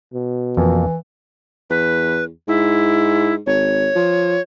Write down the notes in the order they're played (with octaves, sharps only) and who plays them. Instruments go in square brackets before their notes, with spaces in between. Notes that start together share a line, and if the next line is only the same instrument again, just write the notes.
[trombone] B2
[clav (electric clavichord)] F2 A#3 [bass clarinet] E3
[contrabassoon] E2 [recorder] B4
[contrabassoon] G#2 [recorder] E4
[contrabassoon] G#1 [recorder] C#5
[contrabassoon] F3